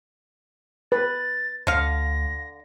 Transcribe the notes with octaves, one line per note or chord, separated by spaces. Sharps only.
B4 A6
D2 D3 F5 A#6